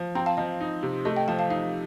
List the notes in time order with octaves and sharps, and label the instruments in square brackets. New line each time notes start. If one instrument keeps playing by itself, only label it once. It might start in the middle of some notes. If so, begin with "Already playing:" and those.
Already playing: [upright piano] F3
[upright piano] C4 [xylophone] G5 A#5
[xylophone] F5 A5
[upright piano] F3 [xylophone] D#5
[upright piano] D#4
C3
[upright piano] A3 [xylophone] D#5
[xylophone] D#5 G5
[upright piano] F3 [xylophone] F5 A5
[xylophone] F5 A5
[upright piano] D#4 [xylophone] F5